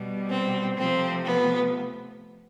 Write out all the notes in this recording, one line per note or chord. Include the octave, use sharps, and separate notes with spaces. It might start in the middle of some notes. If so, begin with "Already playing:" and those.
Already playing: B2 G3
C4
C3 F3 A3 C4
B3